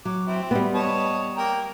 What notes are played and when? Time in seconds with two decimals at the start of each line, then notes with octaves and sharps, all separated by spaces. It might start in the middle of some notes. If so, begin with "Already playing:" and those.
0.05 F#3 D6
0.27 C4 E4
0.51 G3 B3
0.75 C#5 D#5 A5
1.37 A#3 G5 A#5